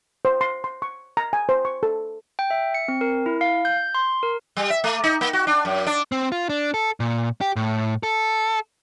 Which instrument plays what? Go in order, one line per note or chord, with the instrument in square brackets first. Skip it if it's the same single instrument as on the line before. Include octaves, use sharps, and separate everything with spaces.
[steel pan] C5
C6
C6
C#6
A#5
G#5
C5
C#6
A4
[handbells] G5
E5
C#7
C4
A#4
E4
F5
G6
C6
A#4
[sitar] G3
E5
A3
D#4
A#3
F#4
D4
F#2
D4
[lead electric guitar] C4
F4
D4
A4
A#2
G4
A2
A4